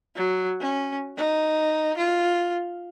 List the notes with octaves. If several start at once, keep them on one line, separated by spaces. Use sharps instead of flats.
F#3
C#4
D#4
F4